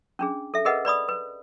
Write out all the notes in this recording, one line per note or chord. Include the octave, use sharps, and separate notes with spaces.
C#4 D4 G#4
A4 E5
G#4 A#4 B4 D#5 F#5
B4 D5 B5 D#6
B4